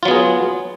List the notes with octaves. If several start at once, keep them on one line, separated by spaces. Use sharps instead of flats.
F#3 B3 F4 G#4